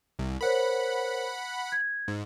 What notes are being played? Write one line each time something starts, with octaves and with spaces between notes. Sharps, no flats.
C2
A#4 C5 C#5 F#5 B5
G#6
G#2